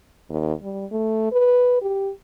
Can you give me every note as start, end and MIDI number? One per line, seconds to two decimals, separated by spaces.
0.29 0.53 39
0.62 0.85 55
0.91 1.29 57
1.32 1.80 71
1.82 2.10 67